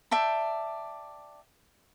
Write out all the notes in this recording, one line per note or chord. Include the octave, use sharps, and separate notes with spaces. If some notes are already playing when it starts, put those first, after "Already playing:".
D5 E5 G5 A5